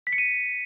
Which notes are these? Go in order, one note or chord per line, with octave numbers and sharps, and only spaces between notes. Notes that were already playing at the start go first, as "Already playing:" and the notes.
B6
C#7
D#7